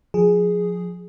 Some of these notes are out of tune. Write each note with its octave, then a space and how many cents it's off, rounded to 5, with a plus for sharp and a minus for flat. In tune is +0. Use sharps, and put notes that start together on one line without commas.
F3 +30 G#4 +0